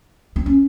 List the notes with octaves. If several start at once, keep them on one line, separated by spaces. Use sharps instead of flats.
C4
C#4